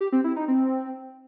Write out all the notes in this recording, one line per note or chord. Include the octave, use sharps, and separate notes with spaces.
G4
C4
E4
D#4
C4